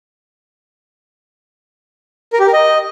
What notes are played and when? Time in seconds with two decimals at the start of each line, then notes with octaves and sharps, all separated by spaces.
2.33 A#4
2.40 G4
2.47 A#4
2.53 D#5